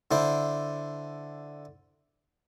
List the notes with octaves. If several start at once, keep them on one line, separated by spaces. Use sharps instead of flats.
D3 E4 C5 D6